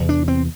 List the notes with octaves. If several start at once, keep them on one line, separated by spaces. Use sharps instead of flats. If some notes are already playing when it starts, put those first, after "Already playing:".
Already playing: E2 C3
D4
C4